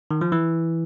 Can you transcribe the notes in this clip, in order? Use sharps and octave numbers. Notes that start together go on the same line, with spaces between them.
D#3
F3
E3